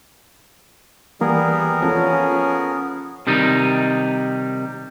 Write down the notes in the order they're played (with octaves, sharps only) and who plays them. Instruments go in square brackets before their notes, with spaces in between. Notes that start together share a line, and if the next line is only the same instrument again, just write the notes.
[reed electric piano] E3 A#3 [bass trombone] G3 [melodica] B3 G#4 A#4
[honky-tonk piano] C#3 F3 A4 [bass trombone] C#4
[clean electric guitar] C3 D#3 G3 D#4